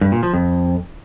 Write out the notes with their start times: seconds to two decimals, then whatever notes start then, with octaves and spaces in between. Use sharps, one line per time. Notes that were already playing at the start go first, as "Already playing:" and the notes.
0.01 G2
0.12 A#2
0.23 F3
0.34 F2